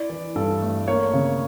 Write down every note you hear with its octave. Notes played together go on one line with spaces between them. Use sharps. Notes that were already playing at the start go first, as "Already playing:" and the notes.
Already playing: E4 D5
E3
G2 A4
A3
A#3 C#5
C#3